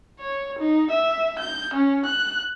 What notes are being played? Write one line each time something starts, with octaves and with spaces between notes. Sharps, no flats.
C#5
D#4
E5
G6
C#4
F#6